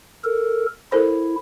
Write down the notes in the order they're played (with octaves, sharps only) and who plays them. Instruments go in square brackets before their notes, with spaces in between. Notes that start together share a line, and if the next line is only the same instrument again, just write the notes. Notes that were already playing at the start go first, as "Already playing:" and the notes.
[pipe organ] A4 A#4
[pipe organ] E4 [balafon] A4 A#4 C5